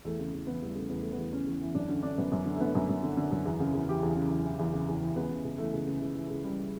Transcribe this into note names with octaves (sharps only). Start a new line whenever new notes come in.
E2 A3
C#3
E2
E3 B3
E2 G3
C#3 A3
E2 B3
E3 A3
B3
E2
C#3 C#4
E2
E3
F#2 D4
D3 C#4
D3 D4
F#2 B3
F#2
D3
A3
D3 B3
F#2
F#2
D3
D3
F#2
E2
C#3
E2
E3 G4
E2
C#3
E2
E3
E2
C#3
E2
E3
C#2 B3
C#3
C#2
E3 A3
C#2
C#3
C#2
E3
C#2
C#3 G3